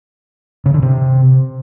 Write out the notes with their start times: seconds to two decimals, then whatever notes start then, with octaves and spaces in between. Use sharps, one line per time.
0.66 C#3
0.74 D3
0.82 C3